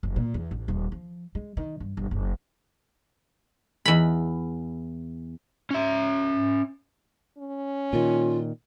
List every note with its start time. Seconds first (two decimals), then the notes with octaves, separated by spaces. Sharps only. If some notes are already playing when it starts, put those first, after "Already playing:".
0.03 F#1
0.16 A#2
0.34 E2
0.51 A1
0.68 D#1
0.92 F3
1.35 G#3
1.57 D#3
1.80 G2
1.97 G1
2.11 F#1
3.86 E2 B5
5.70 C#4 E5
7.38 C#4
7.93 A#2 D#3 F4